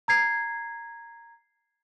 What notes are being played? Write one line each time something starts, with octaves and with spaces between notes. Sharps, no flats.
A#5 G#6 C7